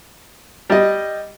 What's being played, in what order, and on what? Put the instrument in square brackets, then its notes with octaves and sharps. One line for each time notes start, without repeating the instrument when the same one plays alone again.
[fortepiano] G3 D#5